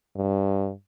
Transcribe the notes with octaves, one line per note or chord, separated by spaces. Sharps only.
G2